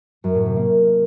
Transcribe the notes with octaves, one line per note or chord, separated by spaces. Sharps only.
F#2
A2
C3
A#3